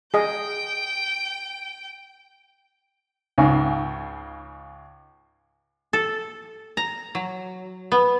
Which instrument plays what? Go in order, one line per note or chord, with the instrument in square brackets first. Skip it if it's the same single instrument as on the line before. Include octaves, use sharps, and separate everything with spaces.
[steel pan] G#4 D#5 [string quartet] G5
[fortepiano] C#2 G#2 C#3
[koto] A4
A#5
F#3
B3